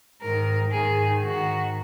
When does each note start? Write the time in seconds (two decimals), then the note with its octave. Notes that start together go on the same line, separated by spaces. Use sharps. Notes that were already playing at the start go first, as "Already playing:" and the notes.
0.21 G#2 D#3 A#4
0.72 G#2 D#3 G#4
1.23 G#2 D#3 F#4